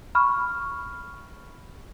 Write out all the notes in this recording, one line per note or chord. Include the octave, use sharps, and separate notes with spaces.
B5 C#6 F6